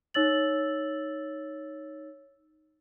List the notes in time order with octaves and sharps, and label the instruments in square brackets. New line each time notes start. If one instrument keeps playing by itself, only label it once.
[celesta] D#4 C#5 E6 A6 F#7